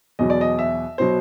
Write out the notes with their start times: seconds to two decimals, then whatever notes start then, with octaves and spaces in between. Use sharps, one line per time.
0.19 E2 B2 F#3 D#5
0.30 D5
0.41 D#5
0.59 E5
0.98 B2 F#3 C5